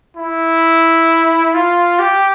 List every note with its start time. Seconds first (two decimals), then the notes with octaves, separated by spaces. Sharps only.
0.16 E4
1.54 F4
1.99 G4